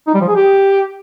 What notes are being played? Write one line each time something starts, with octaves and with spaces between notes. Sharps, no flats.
D#4
G3
F3
G#4
G4